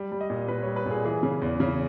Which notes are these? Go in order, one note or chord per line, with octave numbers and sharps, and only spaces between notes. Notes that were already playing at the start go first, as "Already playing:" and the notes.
Already playing: G3
G3
D#5
A#2
A#2 B4
C#5
G3
B4
A#2 G#4
E3 G#4
C#3
E2
C#3